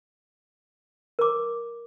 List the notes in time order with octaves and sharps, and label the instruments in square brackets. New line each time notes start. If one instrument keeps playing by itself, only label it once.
[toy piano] A#4 D6